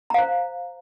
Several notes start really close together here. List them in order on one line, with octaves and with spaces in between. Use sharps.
A#5 F5 C5